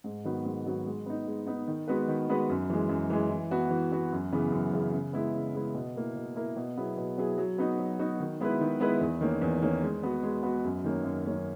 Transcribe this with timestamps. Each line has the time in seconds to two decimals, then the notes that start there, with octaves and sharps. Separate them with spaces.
0.04 G#2
0.24 D#3 F#3 B3 F#4
0.45 G#2
0.65 D#3 F#3 B3 F#4
0.86 G#3
1.06 B3 D#4
1.27 G#3
1.47 B3 D#4
1.67 D#3
1.88 G#3 B3 F#4 B4
2.08 D#3
2.29 G#3 B3 F#4 B4
2.49 F#2
2.70 E3 G#3
2.89 F#2
3.10 E3 G#3
3.30 E3
3.51 B3 F#4
3.71 E3
3.92 B3 F#4
4.12 F#2
4.32 C#3 E3 B3
4.52 F#2
4.73 C#3 E3 B3
4.93 C#3
5.13 G#3 B3 E4
5.34 C#3
5.54 G#3 B3 E4
5.75 B2
5.95 A#3 E4 A#4
6.16 B2
6.36 A#3 E4 A#4
6.57 B2
6.77 F#3 B3 E4 G#4
6.97 B2
7.18 F#3 B3 E4 G#4
7.38 F#3
7.58 B3 D#4 F#4
7.79 F#3
7.99 B3 D#4 F#4
8.20 D#3
8.40 G#3 B3 E4 B4
8.61 D#3
8.80 G#3 B3 E4 B4
9.01 E2
9.21 D#3 A#3 C#4
9.42 E2
9.62 D#3 A#3 C#4
9.82 G#3
10.03 B3 F#4
10.23 G#3
10.43 B3 F#4
10.64 F#2
10.84 D#3 A#3 C#4
11.04 F#2
11.25 D#3 A#3 C#4